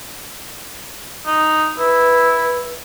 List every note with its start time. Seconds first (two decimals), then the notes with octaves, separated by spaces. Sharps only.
1.26 D#4
1.78 E4 B4